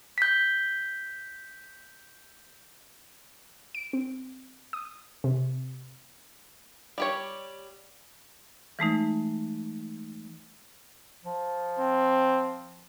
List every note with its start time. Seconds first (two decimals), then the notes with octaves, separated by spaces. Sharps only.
0.18 G6 B6
3.75 D7
3.93 C4
4.73 D#6
5.24 C3
6.98 G3 G4 C#5
8.79 E3 G#3 A3 D#4
11.24 F3
11.79 C4